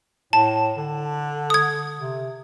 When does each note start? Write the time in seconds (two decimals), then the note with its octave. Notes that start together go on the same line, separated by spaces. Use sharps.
0.33 A2 A5
0.77 D3
1.50 D#6 G#6
2.00 C3